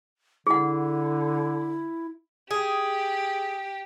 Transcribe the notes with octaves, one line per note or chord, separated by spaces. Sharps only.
D3 E4 G#4 F#5
G4 G#4